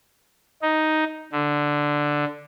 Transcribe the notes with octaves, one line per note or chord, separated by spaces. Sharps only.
D#4
D3